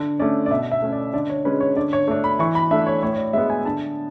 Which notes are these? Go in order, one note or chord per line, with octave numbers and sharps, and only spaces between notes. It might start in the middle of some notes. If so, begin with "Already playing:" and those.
Already playing: D3
A3 C#4 D5
D5
B2 E5
E5
A3 C#4
D5
D3 D5
C#5
G#3 C#4 B4
C#5
D3 D5
C#5
A3 D4 C#5
B5
E3 C#6
B5
A3 D4 E5
C#5
A2 C#5
C#5
D5
G#3 B3 E5
G#5
D3 A5